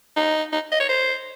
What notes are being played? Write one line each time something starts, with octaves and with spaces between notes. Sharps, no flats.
D#4
D#4
D#5
C#5
C5